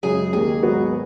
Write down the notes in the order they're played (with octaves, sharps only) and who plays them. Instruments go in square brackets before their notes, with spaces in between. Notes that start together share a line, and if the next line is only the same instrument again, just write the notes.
[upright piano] F#2 C#3 G#3 [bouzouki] G#4
[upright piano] D#2 D#3 A#3 [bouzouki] G#4
[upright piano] G#1 G#2 F#3 B3 F#4